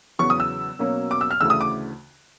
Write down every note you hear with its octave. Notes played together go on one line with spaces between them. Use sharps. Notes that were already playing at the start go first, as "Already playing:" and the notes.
E2 C#3 F#3 B3 C#6
D#6
E6
B2 F#3 A#3 C#4
D6
E6
F6
D2 C#3 E3 A3 E6
D#6
D6